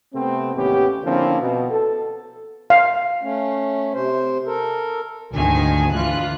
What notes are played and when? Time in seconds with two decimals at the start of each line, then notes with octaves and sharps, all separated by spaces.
0.14 C3 A3 B3 C4
0.55 A1 D#2 B3 C#4 G4
1.04 D3 F3 A#3 C4 C#4 E4
1.41 B2
1.71 A4
2.70 F5
3.22 A3 C#4
3.93 C3 C5
4.46 A4 A#4
5.34 D2 G#2 D#3 F3 G#5
5.94 D2 E3 F4 F#6